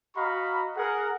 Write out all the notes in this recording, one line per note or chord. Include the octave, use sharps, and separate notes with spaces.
F#4 D#5 F5 A#5 B5 C#6
G#4 A#4 F#5